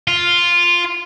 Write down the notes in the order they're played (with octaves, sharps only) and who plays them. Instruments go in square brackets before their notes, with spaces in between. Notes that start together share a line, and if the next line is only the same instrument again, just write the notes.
[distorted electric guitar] F4